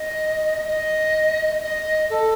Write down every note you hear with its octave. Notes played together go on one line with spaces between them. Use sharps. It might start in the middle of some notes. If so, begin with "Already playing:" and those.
Already playing: D#5
D#5
D#5
A4